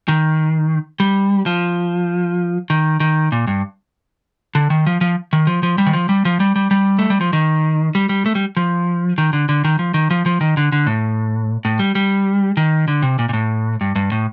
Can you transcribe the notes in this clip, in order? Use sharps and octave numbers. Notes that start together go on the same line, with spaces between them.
D#3
G3
F3
D#3
D#3
A#2
G2
D3
D#3
F3
F3
D#3
F3
F3
G3
D#3
F3
G3
F3
G3
G3
G3
A3
G3
F3
D#3
G3
G3
A3
G3
F3
D#3
D3
D3
D#3
F3
D#3
F3
F3
D#3
D3
D3
A2
A2
G3
G3
D#3
D3
C3
A#2
A#2
A2
G2
G2
A2